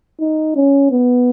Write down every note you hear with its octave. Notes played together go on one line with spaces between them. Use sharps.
D#4
C#4
B3